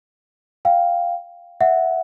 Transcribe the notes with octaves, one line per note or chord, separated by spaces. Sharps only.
F5 G5
E5 F#5